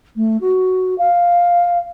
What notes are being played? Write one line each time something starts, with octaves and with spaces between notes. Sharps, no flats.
A3
F#4
F5